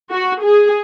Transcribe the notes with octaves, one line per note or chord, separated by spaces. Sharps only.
F#4
G#4